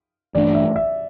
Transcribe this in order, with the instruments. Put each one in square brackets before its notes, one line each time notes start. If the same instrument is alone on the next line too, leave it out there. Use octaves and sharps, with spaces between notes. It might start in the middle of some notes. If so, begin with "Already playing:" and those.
[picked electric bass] G2 E3 A3 D4 [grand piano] D5
[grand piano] E5
E5